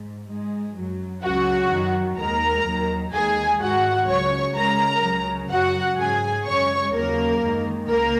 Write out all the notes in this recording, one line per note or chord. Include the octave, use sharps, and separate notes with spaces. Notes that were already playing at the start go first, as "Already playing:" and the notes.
Already playing: G#2
G#2 G#3
F#2 F#3
C#2 C#3 F#3 F#4 F#5
F#2 D#3 F#3
D#2 D#3 G#3 A#4 A#5
D#2 D#3 F#3
D#2 D#3 G#3 G#4 G#5
G#2 D#3 G#3 F#4 F#5
C#2 C#3 F#3 C#5 C#6
C#2 C#3 G#3 A#4 A#5
C#2 C#3 F#3
F#2 C#3 F#3 F#4 F#5
G#2 F#3 G#4 G#5
F#2 C#3 G#3 C#5 C#6
D#2 C#3 F#3 A#3 A#4
F#2 D#3 G#3
C#2 A#3 A#4